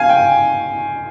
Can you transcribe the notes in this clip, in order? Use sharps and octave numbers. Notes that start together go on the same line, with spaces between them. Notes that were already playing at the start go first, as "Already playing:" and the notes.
Already playing: F5 G#5
G5